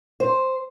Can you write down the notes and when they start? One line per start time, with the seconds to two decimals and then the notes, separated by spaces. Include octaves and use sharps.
0.20 C5